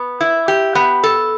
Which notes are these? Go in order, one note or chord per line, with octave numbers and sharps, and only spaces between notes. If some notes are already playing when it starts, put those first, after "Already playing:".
Already playing: B3
E4
G4
B3
A4